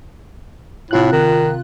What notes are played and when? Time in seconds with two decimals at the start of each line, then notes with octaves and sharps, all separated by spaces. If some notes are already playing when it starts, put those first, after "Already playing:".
0.91 A2 C3 F4 F#6
1.12 D#3